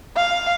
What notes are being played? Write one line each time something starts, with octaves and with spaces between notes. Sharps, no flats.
F5